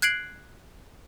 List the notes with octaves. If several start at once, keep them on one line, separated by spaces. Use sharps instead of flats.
F#6 G#6 C7 D7 F#7